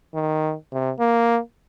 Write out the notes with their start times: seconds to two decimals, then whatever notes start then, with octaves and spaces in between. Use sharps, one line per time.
0.15 D#3
0.72 C3
1.00 A#3